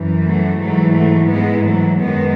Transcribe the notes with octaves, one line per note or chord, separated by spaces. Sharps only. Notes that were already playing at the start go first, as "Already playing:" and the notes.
Already playing: F#2 E3
F#3 A3
G#2 E3 F#3 A3
F#3 A3
G#2 E3 G#3 B3
F#3 A3
F#2 D#3 G#3 B3